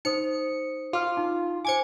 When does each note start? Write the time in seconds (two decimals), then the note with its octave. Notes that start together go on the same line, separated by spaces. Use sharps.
0.05 D#4 C5 D#6 C#7
0.93 F4 D6 F6
1.17 D#4
1.65 C5 G#5 D6 G#6 C#7